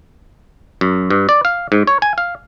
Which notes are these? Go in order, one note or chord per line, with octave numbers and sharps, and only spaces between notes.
F#2
G2
D5
F5
G#2
C#5
G#5
F5